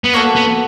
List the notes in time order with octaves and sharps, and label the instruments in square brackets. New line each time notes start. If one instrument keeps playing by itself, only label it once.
[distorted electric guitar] B3
[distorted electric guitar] A#3 [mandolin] F#4 A4 C#5 F#5
[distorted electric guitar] B3